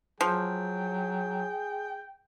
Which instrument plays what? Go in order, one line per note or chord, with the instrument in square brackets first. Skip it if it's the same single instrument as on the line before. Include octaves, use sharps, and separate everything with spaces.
[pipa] F3 [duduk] F#3 [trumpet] G#4 [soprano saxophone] G5